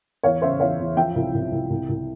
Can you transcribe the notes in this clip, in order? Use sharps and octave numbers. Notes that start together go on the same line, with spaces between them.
E2 C#5 F5
C#3 C5 E5
E2 C#5 F5
E2
F3 E5 G5
C2
C2
C2
C2
C2